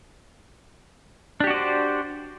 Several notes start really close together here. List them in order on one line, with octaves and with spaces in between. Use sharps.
D4 G4 F#4 D5 C5